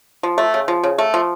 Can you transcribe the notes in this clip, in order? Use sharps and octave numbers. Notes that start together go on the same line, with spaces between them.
F3
A3
C#3
F3
C#3
A3
F3